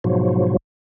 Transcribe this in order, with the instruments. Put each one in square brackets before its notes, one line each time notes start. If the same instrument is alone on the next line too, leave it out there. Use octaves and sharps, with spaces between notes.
[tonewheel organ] G#2 B2 F3 F#3